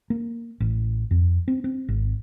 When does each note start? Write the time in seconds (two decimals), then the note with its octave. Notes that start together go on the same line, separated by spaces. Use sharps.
0.10 A#3
0.60 A1
1.11 F2
1.48 C4
1.64 C4
1.89 G#1